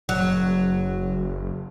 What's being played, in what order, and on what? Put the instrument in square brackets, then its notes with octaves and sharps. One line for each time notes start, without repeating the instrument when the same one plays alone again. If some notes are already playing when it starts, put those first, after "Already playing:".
[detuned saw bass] F#1 [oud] F#3